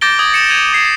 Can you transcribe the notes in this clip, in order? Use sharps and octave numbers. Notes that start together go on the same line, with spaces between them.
D6 G6 A6 A#6 D7 G7
D#6 G#6 F#7
C#7 E7
G#6 C#7 D#7 F7 F#7
D6 G#6 C7 C#7 E7